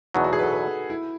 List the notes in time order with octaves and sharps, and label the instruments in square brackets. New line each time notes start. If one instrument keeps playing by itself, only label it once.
[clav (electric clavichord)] E2 B2 F#3 [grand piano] D#4
[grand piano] F#4
G#4
B4
A4
B4
E4